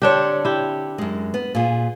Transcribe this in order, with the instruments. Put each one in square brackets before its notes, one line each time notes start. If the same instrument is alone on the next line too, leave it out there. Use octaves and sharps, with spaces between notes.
[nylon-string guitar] D3 C#5 [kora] C4 D4 G4
[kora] E4 G4
[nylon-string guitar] F#2 G#3
B3
A#2 G#4